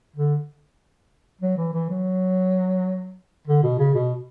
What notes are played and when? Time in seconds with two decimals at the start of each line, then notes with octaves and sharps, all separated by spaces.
0.16 D3
1.41 F#3
1.57 E3
1.74 E3
1.89 F#3
3.47 D3
3.63 B2
3.79 C#3
3.94 B2